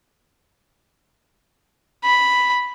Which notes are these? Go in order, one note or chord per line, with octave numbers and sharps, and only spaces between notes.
B5